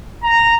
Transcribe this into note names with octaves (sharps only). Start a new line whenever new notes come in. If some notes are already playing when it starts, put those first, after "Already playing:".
A#5